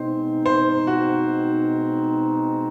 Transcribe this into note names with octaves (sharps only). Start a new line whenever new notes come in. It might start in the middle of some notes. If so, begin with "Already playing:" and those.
Already playing: B2 G#3 C4 D#4 C5
C5
F#4